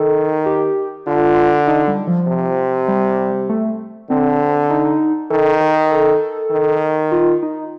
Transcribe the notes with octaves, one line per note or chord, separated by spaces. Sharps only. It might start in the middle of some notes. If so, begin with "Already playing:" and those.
Already playing: D#3 A4
G4
D3 F4
D#4
G3
F3
C3
G3
A3
D3 C4
D#4
D#3 A4
A#4
A4
D#3
F4
D#4